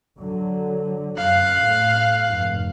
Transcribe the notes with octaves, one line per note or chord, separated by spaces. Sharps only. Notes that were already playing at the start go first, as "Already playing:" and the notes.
D3 F#3
F#2 F5 F#6
A2
F1 G#2